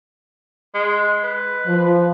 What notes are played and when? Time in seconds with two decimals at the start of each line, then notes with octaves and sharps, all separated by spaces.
0.75 G#3
1.24 B4
1.66 F3